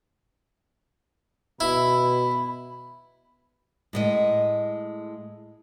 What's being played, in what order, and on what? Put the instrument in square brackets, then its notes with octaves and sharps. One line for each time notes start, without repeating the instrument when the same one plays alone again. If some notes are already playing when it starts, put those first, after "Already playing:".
[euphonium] B2 [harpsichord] E4 [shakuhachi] B5
[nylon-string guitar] A2 G#3 D#5